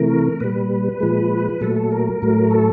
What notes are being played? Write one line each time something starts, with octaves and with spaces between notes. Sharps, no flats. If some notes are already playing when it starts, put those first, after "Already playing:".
Already playing: C3 E3 A3 A#4
A#2 G3 B4
A#2 F3 G#3
A#2 F#3 A3 A4
A4
A#4
A2 F#3 A3
A4